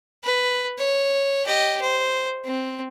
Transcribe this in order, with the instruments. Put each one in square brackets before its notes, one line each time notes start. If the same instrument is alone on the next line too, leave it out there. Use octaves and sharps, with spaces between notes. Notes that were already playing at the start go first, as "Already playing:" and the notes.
[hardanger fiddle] B4
C#5
G4 D#5
C5
C4